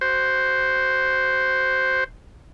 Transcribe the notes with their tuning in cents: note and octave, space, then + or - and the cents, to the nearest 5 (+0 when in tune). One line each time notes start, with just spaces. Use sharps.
F#4 +20 C5 +0